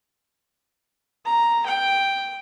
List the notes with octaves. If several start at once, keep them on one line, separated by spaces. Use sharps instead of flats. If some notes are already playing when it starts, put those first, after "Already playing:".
A#5
G5